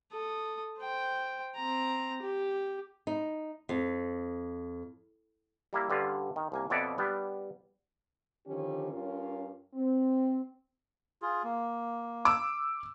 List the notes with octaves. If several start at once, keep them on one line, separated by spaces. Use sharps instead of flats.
A4 D#6
C5 G5
C4 A#5
G4
D#4
F2
G3 A#3 E4
G2 D3 C#4 F4
D#3
C2 A#3 G#5
F2 B2 F#4 C#5 D5 E5
G3 B3 D4
D3 D#3 F3 C#4 G4
G2 C#4 F4 A#4 C#5
C4
F4 G#4
A#3
D6 E6